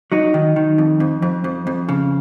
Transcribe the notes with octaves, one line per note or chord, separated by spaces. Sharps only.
F#3 D#4
D#3
D#3
F2
F2
F2
F2
F2
C#3